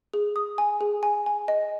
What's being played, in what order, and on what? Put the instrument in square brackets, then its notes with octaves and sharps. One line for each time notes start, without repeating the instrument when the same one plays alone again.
[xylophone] G#4
D#6
G#5
G#4
G#5
G#5
D#5